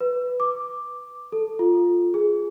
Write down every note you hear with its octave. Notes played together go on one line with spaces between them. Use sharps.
B4
D6
A4
F4
G#4